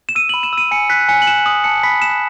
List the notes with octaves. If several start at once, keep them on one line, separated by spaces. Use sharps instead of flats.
E7
E6 D#7
B5 F#7
E7
E6 D#7
G#5 C#7
F#6 B6
G#5 C#7
F#7
F#6 E7
D#6 F#7
A5 C#7
B5 B6
F#6 E7